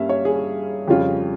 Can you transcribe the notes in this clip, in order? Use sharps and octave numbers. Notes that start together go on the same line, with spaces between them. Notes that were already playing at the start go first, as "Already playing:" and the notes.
Already playing: G2 G3 A#3 C#4 E5 F5
C#5
G#4
F2 C#3 G3 C#4 F4